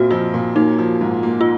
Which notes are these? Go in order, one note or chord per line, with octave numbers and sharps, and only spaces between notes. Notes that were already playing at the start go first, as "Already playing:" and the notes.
Already playing: A#2 C4 F#4
F3 F4
A#2
A#3 D#4
F3
G#2
A#3
F4